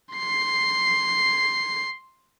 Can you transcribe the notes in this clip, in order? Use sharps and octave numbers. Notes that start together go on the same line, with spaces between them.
C6 C7